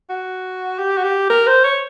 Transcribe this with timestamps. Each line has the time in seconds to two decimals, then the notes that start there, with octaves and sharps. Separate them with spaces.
0.09 F#4
0.79 G4
0.97 F#4
1.04 G4
1.30 A#4
1.47 C5
1.64 C#5